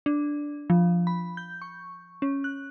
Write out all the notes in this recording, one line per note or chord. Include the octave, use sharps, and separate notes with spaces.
D4
F3
B5
G6
C#6
C#4
F#6